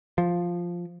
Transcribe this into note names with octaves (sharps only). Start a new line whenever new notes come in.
F3